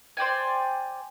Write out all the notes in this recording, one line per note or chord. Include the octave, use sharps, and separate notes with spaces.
C5 D5 G5 G#5